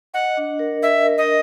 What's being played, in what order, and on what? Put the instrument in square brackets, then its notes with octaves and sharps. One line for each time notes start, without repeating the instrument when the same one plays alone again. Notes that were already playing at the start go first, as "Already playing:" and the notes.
[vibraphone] D#5 [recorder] F#5
[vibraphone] D4
A#4
[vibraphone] D#5 [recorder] E5
[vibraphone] A#4
[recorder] D#5